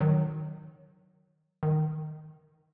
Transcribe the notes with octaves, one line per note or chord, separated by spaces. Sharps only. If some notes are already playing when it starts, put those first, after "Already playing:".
D#3 F#3
D#3